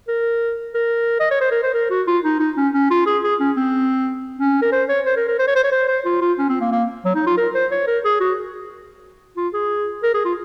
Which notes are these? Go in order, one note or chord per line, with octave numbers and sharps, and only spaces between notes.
A#4
A#4
D#5
C#5
C5
A#4
C5
A#4
F#4
F4
D#4
D#4
C#4
C#4
F4
G#4
G#4
C#4
C4
C#4
A#4
C5
C#5
C5
A#4
A#4
C5
C#5
C5
C#5
C5
C5
F4
F4
C#4
C4
A#3
A#3
F#3
D#4
F4
A#4
C5
C#5
A#4
G#4
F#4
F4
G#4
A#4
G#4
F4